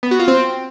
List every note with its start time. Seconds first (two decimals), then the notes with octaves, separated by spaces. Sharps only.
0.03 B3
0.11 F#4
0.20 F4
0.28 C4